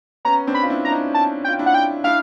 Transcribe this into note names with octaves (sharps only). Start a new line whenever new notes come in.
B3 C#4 A#5
C4 D4
B5
F4
D4 E4
D4 A#5
C#4 D#4
A5
G5
F4
D4 E4
F#5
G5
D4 E4 F5